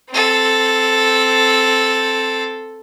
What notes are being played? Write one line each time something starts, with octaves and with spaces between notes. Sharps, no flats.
C4 A4